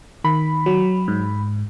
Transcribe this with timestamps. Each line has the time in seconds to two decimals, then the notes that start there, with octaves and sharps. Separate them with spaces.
0.24 D#3 B5
0.66 F#3
1.08 G#2